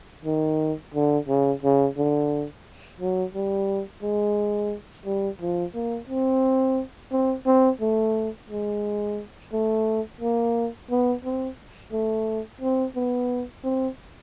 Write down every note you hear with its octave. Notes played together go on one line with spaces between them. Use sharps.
D#3
D3
C#3
C#3
D3
F#3
G3
G#3
G3
F3
A#3
C4
C4
C4
A3
G#3
A3
A#3
B3
C4
A3
C4
B3
C4